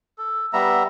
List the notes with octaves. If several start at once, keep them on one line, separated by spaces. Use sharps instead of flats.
A4
G3 B3 E5 A#5